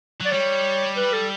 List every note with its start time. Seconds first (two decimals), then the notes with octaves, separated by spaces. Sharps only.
0.21 F#3 D5
0.31 G3 C#5
0.96 B4
1.13 A4